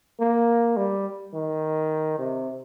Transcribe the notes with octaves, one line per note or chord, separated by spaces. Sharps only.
A#3
G3
D#3
C3